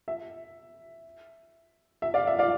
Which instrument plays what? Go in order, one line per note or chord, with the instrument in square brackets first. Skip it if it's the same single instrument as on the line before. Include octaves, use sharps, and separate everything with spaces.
[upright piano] E5
E5
D5 F5
E5
D5 F5